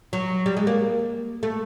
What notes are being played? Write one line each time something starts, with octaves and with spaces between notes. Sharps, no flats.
F#3
G3
G#3
A#3
A3